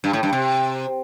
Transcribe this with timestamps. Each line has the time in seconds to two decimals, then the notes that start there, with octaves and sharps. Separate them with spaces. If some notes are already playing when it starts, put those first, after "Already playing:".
0.04 G2
0.13 A2
0.23 G2
0.33 C3